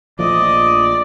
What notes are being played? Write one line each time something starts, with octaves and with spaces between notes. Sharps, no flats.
A#1 F3 A3 D5 D#5 D#6